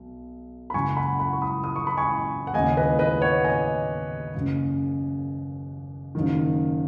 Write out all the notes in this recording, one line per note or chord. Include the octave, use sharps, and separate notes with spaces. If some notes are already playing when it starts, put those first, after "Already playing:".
Already playing: B1
B5
F#1 F#2 C#3 G#5 C#6
F#5 B5
F#5 B5
C#6
B5 D#6
D#6
C#6
B5
G#5 C#6
F#5
D#2 C#3 D#5 G#5
B4 D#5
B4 D#5
C#5 F#5
D#5 G#5
F#1 F#2 C#3
F#1 F#2 D#3